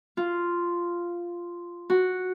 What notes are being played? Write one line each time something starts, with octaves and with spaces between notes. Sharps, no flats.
F4
F#4